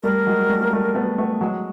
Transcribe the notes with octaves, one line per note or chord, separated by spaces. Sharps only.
G3 A3 A#4
F#3 G#3
G3 A3
A#3
G3 A3
A3 B3
A3 B3
F#3 G#3